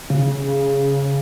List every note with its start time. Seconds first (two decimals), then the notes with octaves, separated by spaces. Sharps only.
0.10 C#3